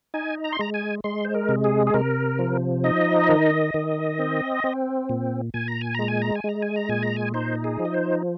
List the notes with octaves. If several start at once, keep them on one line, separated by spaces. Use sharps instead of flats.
D#4 G#5
A#5
C6
G#3 A#5
G#5
G#3 C6
C5
A#4
C3
G#4
G#4
C3 A#4
F3
D#4 D#5
D#3
D#3
C4
C4
A#2
A#2 G#5
A#5
G#5
G#3 A#5
G#5
A#5
G#5
G#3 A#5
G#5
A#5
A#2 G#5
A#5
G#5
D#4 C5
G#4
F3
D#5
C5